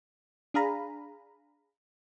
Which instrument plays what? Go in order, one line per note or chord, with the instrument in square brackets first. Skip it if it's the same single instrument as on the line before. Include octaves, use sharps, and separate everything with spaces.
[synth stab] D4 G#4 F5 A#5 B5